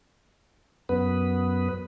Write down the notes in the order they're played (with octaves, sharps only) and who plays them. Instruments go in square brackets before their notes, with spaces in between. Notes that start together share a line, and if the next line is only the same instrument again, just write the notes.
[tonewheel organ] F#2 B3 B4